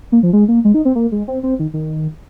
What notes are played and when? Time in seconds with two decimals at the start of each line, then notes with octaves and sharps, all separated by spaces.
0.12 A#3
0.23 F3
0.33 G#3
0.48 A#3
0.65 G#3
0.74 D#4
0.85 C4
0.95 A#3
1.12 G#3
1.28 C4
1.43 C4
1.59 D#3
1.74 D#3